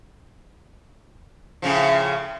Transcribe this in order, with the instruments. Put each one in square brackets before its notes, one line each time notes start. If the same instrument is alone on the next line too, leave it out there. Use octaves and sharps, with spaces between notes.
[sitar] A2 C#3 F3